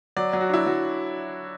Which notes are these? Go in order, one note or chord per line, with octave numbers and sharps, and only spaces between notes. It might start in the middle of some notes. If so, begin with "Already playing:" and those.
F#3 D5
F#3
F#4
D4 E4
F#3 F#4